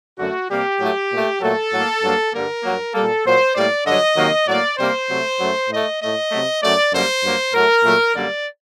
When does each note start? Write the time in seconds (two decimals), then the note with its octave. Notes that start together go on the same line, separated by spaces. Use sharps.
0.19 F#2 D3 A3 F#4
0.50 C3 G3 A#3 G4
0.81 A2 F#3 A3
1.11 A#2 A3
1.41 A#2 F#3 A3 A4
1.73 A2 F#3 A#3
2.03 G2 F#3 A#3
2.33 G2 D3 G3 A#3 A#4
2.63 G2 F#3 A#3
2.94 A#2 G3 A#3 A4
3.25 A#2 F#3 A#3 C5
3.55 A2 G3 A#3 D5
3.86 G2 D3 F#3 D#5
4.16 C3 D#3 F#3 A#3
4.48 A2 F#3 A#3 D5
4.78 C3 G3 A#3 C5
5.09 C3 F#3 A3
5.39 F#2 F#3 A3
5.69 A2 A3 D#5
6.00 A2 A3 D#5
6.31 C3 F#3 A3
6.62 F#2 F#3 A3 D5
6.93 F#2 D3 G3 A#3 C5
7.23 G2 F#3 A#3
7.53 A2 F#3 A3 A#4
7.84 A#2 F#3 A3
8.15 F#2 D3 G3 A#3 D5